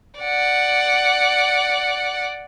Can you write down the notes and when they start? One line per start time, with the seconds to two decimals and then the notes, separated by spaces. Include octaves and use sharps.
0.20 D5 F#5